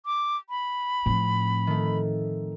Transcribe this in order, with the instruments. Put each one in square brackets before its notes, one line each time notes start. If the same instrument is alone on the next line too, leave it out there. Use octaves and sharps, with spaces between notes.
[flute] D6
B5
[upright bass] A2 F3 [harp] C4
[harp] D#3 A3